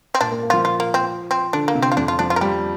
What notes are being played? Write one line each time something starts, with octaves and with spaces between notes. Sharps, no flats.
C4
A#2 D4
A#3
A#3
F3 F4
F4
A#3
C4
C4
D3 D4
A#3
C3
C4
F4
F2 D4
F4
F3 D4
F4
A#4
G3 G4